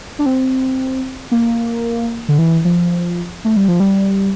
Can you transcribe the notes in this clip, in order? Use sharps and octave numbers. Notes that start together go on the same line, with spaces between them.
D4
C4
A#3
D3
E3
F3
A3
G3
F3
G3